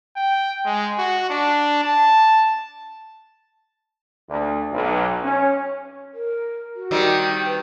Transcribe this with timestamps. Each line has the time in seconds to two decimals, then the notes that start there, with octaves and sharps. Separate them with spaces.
0.16 G5
0.65 G#3
0.98 F#4
1.30 D4
1.83 A5
4.29 D2
4.71 B1
5.23 C#4
6.14 A#4
6.76 F#4
6.91 D#3 G3 C4
7.45 B4